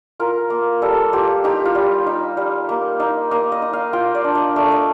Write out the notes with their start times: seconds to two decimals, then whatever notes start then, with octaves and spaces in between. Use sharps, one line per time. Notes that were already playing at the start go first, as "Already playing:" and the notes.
0.20 F4 A#4
0.50 A#3
0.82 G3 A4
1.13 F4 G4
1.44 D#4 G4
1.65 F4
1.75 G3
2.07 D#4
2.37 G3
2.69 A#3
3.00 D#4
3.31 A#3 D#5
3.52 D#5
3.62 D#4
3.73 F5
3.93 F4 G5
4.15 D5
4.24 D4
4.35 D#5
4.56 A3 D5
4.72 D#5